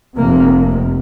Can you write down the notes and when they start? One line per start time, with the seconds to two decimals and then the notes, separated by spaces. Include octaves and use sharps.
0.16 F1 F2 C3 A#3